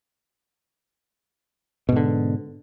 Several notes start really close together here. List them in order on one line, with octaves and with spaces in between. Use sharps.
B2 G#2 D3